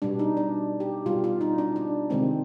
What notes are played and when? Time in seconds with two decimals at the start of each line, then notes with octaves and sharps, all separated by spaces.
0.02 B2 G3 D4
0.19 D#4
0.37 D4
0.80 G4
1.06 B2 G3 F4
1.24 F4
1.41 D#4
1.58 D4
1.76 D4
2.10 C3 D#3 G#3 C4